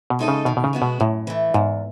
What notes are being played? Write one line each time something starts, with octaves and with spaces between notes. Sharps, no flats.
B2
G#3 D#4 A4 D#5
C#3
B2 D#3
B2
C#3
G#3 B3 F#4
B2
F#2 A2
E3 A3
E2 G#2